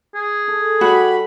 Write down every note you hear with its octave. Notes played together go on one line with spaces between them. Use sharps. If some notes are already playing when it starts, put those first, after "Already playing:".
G#4
A4
G3 F#4 B5